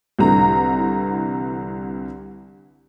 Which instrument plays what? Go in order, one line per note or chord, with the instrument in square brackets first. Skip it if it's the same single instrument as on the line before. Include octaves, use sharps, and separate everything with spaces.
[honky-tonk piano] C2 D3 E3 A#5